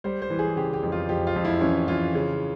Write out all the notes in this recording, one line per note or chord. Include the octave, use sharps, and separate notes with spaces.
G3 C5
C5
E3
G#4
C#3 G4
G4
F2
F4
F2 G4
F4
F2
E4
E3 C#4
E3 F4
C#3